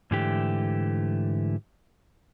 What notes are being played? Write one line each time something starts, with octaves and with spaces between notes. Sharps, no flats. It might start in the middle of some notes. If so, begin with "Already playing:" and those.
G#2 D3 E3 A3 G4